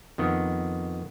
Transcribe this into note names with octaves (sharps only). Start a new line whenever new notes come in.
F2 D#3 B3